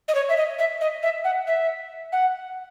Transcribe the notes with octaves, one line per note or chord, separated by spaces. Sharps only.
D#5
C#5
E5
D#5
E5
D#5
E5
F#5
E5
F#5